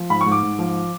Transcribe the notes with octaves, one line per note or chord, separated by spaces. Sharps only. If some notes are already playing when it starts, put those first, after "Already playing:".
Already playing: F3
G#2 B5
C#6
G#2
D6
G#2
F3